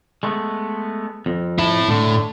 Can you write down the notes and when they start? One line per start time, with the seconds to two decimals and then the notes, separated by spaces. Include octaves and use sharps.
0.23 G#3 A3 B3
1.26 F2
1.59 E4 A5
1.89 A2 D3